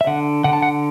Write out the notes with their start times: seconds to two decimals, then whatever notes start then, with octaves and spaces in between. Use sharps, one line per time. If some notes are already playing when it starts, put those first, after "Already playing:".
0.01 E5
0.07 D3 F#5
0.44 D3 F#5
0.53 A5
0.62 F#5